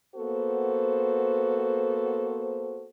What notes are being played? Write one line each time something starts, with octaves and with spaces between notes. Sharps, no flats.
A#3 B3 F#4 A4 C5